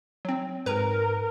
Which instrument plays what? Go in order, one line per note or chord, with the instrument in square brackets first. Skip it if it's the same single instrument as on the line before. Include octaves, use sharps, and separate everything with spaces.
[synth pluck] F#3 C4
[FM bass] G#2 [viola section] A#4 [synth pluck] B4 A#5